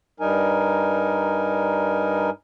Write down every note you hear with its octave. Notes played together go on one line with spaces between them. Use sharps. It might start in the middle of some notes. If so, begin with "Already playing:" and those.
G2 G3 D#4 A#4 G#5